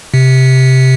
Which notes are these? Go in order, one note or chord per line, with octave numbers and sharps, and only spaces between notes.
C3